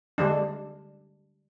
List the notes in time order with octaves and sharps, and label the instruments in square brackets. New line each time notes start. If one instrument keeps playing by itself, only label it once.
[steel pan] D3 G3 G#3 D4